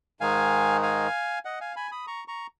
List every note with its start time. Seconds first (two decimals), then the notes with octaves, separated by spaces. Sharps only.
0.21 G#2 D#3 G#3 D#4 F5 G#5
0.83 F5 G#5
1.45 D#5 F#5
1.61 F5 G#5
1.76 G#5 B5
1.91 B5 D#6
2.07 A#5 C#6
2.28 A#5 C#6